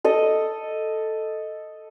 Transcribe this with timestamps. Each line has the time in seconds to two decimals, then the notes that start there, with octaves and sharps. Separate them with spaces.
0.04 A4 D#5